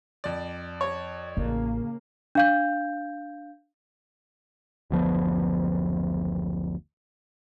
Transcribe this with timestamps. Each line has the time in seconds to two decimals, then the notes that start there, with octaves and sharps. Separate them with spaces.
0.24 F2 D5
0.81 C#5
1.37 A1 C#3 A#3
2.35 D4 F5 G6
4.90 F#1 D2 F3 B3